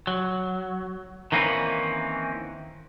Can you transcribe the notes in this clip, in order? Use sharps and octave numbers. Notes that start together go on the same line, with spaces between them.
F#3
D#3 E3 A#3 C4 C#4 B4